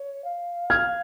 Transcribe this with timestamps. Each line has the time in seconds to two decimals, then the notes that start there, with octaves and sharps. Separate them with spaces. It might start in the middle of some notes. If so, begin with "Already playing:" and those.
Already playing: C#5
0.24 F5
0.70 F6 G#6